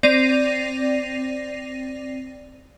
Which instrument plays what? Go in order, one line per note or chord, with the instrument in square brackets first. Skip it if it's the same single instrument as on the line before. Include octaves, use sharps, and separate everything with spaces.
[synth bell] C4 D5 A#6 C7 D#7 F7